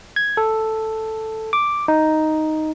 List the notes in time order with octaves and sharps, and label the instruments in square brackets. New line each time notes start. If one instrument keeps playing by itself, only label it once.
[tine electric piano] G#6
A4
D6
D#4